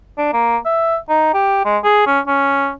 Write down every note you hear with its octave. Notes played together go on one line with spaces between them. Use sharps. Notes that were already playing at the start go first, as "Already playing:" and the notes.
D4
A#3
E5
D#4
G4
G#3
G#4
C#4
C#4